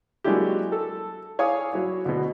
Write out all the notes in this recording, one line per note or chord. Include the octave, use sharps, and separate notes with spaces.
F#3 G#3 A#3 D4 E4 G4
A4
E4 C#5 F5 G#5 D6 D#6
F#3 E4 C#5
D2 B2